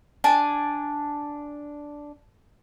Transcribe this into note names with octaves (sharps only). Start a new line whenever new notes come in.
D4 G#5 A5